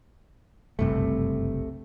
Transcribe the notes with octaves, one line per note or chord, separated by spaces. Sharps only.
F#1 C2 G2 C3 A3